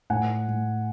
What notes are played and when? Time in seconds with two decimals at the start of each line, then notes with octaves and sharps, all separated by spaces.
0.10 A2 F#5 G#5
0.48 A2